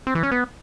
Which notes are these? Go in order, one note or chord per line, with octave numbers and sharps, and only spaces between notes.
C4
E3
C#4
B3